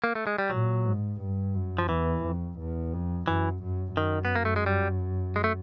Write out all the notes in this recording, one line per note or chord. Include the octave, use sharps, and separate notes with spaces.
A#3
A3
G#3
G3
A#2 F#3
G#2
G2
F#2
F3
E2 E3
F2
E2
F2
F#2 E3
F#2
F#2 D#3
B3
A#3
A3
G#3
G3
G#3
A3